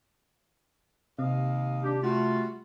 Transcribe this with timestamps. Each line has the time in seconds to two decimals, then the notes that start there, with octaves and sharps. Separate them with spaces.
1.19 D#2 C3 D#5 F5
1.83 D4 G4
2.02 G3 A3 F4 F#4